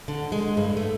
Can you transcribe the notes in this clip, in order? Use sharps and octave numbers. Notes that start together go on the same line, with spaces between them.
D3
G#3
G2
A3